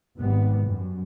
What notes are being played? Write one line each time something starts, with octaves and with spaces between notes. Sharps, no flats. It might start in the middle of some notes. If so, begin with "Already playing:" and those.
G#1 G3 B3
F#2